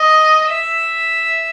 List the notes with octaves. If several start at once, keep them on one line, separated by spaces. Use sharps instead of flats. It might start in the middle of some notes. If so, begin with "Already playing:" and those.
Already playing: D#5
E5